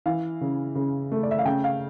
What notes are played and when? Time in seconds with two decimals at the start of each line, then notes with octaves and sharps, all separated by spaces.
0.06 E3 F5
0.41 C#3
0.75 C#3
1.12 A3
1.23 D5
1.31 E5
1.39 F5
1.45 C#3 G5
1.64 F5